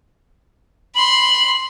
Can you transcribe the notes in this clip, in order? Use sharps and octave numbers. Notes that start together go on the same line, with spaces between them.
B5 C6 F#7